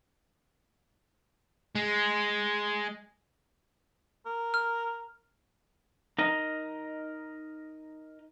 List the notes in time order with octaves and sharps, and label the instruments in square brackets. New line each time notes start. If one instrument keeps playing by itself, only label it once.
[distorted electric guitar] G#3
[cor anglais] A#4
[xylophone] F6
[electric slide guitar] D#4 A#4 D#5